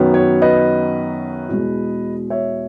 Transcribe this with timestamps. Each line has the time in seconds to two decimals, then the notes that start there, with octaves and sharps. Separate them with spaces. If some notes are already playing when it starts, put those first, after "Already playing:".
Already playing: F#2 D#3 F#3 B3
0.14 C#5
0.42 B4 D#5
1.49 E2 B2 G#3
2.30 C#5 E5